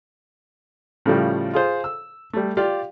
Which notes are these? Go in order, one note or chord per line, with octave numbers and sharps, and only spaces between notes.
A2 C#3 F3 G3
F4 G#4 C5
E6
G3 A3
F4 G4 D5 F5